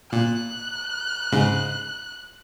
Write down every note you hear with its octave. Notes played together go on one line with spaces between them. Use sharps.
A#2 F#6
G#2 C#3